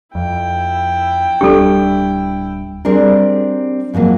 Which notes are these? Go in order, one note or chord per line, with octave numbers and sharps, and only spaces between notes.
F2 E4 G5
D1 G3 D4 G4 A4
G3 C4 D4 G#4 A#4
G#2 F3 F#3 A#3 C4